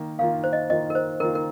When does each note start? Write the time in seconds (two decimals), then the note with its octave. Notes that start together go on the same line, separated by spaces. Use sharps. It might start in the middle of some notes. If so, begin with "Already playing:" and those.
Already playing: D#3 A#3
0.19 D#3 A#3 F4 F5
0.44 C5
0.53 D#5
0.70 D#3 A#3 F4 D#5
0.90 A#4
0.95 C5
1.20 D#3 A#3 F4 A#4
1.35 A#4